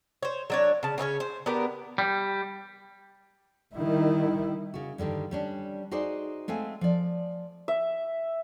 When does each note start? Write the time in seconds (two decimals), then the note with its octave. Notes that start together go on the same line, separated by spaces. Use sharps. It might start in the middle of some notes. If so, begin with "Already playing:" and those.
0.23 C5 C#5
0.50 F#3 D4 C#5
0.83 C#3 A5
0.98 C#3 C#4 A4 C#5
1.20 C5
1.46 B3 D4 G4 A#4
1.98 G3
3.75 D#3 G3 E4
4.74 C#3 F#4
4.98 G2 D3 D#3 G3
5.31 G3 C#4 D4
5.91 D#4 F#4 G#4 C5 D5
6.48 G#3 A3 C4 F5 G#5
6.81 F3 D5
7.68 E5